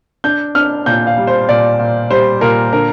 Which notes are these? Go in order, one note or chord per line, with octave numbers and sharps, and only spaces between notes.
D4 G6
D4 F6
A#2 G6
F5
G3
C5
A#2 D5
A#2
G3 C5
A#2 A#4
D3 A#4